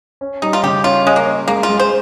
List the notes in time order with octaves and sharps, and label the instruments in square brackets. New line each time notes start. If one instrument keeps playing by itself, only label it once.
[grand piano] C#4
[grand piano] G3 [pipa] D#4
[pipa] F4
[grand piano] C#3 [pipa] G4
[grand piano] C#4 [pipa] F4
[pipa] G#3 [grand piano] C#4
[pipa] A#3
[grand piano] C#4
[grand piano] G#3 [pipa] A#3
[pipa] F4
[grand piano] G#3
[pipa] C5